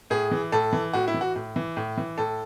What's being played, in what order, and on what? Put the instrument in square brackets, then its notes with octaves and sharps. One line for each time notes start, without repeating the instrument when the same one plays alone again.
[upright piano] A2 G#4
E3
A2 A4
E3
A2 F#4
E4
E3
F#4
A2
E3
A2
E3
A2 A4